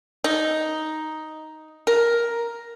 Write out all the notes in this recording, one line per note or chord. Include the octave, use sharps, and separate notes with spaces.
D#4
A#4